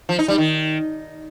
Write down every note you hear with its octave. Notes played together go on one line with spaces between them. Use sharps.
F3
D#4
G3
D#3